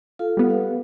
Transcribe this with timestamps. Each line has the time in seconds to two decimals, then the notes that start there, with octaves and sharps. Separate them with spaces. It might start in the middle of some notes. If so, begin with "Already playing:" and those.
0.19 F4 A4 F5
0.37 G3 B3
0.50 F5